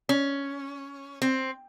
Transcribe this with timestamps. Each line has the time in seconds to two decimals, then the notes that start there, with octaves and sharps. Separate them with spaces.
0.09 C#4
1.22 C4